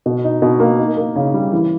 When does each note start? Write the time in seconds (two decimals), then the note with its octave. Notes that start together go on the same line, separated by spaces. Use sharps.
0.06 B2
0.24 D#4
0.42 B2
0.60 A#3
0.79 D#4
0.97 A#3
1.15 C#3
1.34 G3
1.52 E3